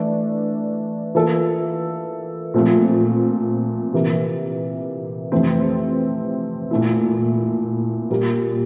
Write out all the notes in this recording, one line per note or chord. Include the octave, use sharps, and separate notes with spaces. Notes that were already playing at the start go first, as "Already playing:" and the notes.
Already playing: E3 A3 D4
E3 A#3 F4 A4
A#2 F3 A3 C4 F4
C3 E3 A#3
F2 C3 E3 A3 C4
A#2 A3 E4
A#2 G3 A#3